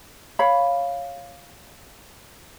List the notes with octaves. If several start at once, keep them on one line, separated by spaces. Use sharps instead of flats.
C#5 F5 B5